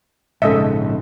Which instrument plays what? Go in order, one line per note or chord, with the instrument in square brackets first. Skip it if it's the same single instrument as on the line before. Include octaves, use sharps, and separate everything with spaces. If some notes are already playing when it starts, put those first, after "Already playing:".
[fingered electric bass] A#1 G#2 C#3 [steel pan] A4 D#5 E5